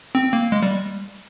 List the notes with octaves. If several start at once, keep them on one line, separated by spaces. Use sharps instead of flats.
C4
A#3
G#3
G3